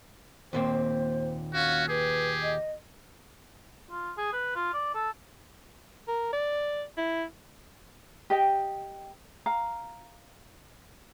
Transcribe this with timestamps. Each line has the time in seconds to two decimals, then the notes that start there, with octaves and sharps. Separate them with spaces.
0.53 D#2 A#2 C4 C5
1.54 C#4 F#4 F5
1.89 G4 G#4 B4
2.43 D#5
3.91 F4
4.18 G#4
4.33 B4
4.55 F4
4.74 D5
4.95 A4
6.08 A#4
6.33 D5
6.97 E4
8.30 G4 D#5 G5
9.46 F5 A#5